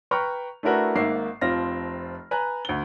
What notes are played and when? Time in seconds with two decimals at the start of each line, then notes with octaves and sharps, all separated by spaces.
0.11 B4 G5 A#5 B5 C#6 F6
0.63 A3 D4 E4 F#4 A#4 B4
0.95 G#1 G#2 A#3 E5 C7
1.41 F1 F3 C4 F4 F6 A#6
2.31 B4 G#5 A#5 F#6
2.65 D2 G7